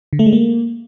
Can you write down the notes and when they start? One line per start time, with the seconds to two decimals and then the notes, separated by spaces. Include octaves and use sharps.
0.13 D3
0.19 A3
0.26 G#3
0.33 A#3